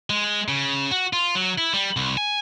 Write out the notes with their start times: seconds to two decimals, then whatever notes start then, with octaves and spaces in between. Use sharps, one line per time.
0.10 G#3
0.48 C#3
0.91 F#4
1.13 F4
1.35 F#3
1.58 E4
1.74 G3
1.96 C2
2.17 G#5